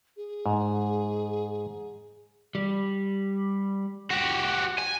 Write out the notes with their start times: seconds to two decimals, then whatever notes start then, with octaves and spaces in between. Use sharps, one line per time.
0.17 G#4
0.46 G#2
2.55 G3
4.11 F#4 G4
4.78 G#5